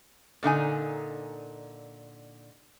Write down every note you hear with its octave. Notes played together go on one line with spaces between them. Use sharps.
A#2 D3 D#4 G#5